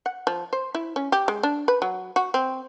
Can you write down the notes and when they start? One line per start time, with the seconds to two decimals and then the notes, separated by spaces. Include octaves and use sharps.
0.06 F#5
0.27 F3
0.53 C5
0.75 E4
0.96 C#4
1.12 G4
1.28 G#3
1.43 D4
1.68 B4
1.82 F#3
2.16 F#4
2.34 C4